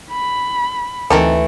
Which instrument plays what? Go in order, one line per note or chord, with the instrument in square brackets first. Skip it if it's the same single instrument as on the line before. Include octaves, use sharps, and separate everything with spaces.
[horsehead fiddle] B5
[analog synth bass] D2 [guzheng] E3 A3 A4 [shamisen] C4 D#4 A#4